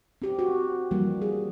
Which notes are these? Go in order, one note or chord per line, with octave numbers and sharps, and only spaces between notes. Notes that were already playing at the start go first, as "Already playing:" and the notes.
C4 G4
F#4
E3 F3 G3 A#3
G#4